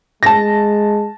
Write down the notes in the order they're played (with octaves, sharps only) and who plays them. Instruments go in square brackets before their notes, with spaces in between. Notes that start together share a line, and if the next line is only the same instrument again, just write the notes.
[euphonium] G#3 [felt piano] A5 A#6